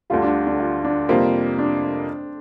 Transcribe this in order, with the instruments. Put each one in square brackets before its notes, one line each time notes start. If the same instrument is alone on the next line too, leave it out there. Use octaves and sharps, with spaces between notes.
[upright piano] D2 D3 G3 [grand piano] F4
[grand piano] D4
D4
F4
D4
[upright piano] F2 C3 G3 A#3 F4 [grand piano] C4
[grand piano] D4